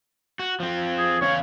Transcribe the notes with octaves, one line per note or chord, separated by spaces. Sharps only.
F#4
F3 C4
G#4
E2 C#4 C#5 F5